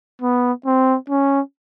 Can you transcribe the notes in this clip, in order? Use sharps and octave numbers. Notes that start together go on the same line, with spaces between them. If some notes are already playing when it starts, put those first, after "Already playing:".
B3
C4
C#4